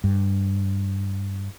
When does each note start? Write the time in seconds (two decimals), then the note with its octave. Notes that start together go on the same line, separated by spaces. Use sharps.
0.04 G2